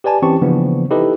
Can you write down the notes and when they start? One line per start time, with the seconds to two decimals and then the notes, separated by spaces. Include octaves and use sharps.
0.04 G4 B4 D5 G#5 A5
0.22 E3 C4 C#4 G4 A5 C#6
0.41 C#3 E3 F3 A#3 B3 D4
0.91 D#4 E4 G4 A4 B4 D#5